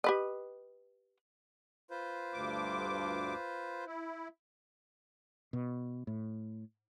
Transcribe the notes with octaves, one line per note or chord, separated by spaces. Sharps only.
G4 B4 D#5
F4 B4 C5
D2 G2 D6
E4
B2
A2